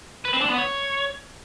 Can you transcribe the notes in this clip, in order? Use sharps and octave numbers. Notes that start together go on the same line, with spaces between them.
B4
C4
D4
B3
C#5